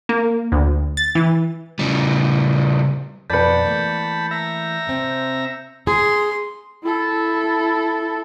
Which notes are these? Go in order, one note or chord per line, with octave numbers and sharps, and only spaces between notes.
A#3
D2
A6
E3
C#3 G3
F2 B2 B4 D5 A5 B5 G6 C#7
E3 A3 A#3
E5 A#5
C3 C4
G#4 C6
E4 A4